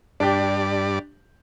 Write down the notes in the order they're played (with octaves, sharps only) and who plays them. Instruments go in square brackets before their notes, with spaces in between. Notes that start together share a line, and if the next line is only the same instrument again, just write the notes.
[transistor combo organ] G2 D5 [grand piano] D4 G4